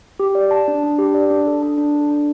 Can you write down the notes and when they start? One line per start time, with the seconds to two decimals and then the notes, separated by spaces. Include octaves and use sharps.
0.20 G4
0.35 D5
0.51 A5
0.68 D4
0.83 D4
0.98 G4
1.14 D5
1.30 D4
1.47 A4
1.62 D4
1.78 D4
1.95 A4
2.10 D4